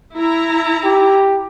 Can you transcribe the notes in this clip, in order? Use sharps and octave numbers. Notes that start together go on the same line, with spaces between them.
E4 A#5
G4